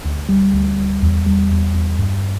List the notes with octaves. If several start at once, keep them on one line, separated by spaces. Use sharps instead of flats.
D2
G3
D2
G3
E2
G3
E2
E2
G2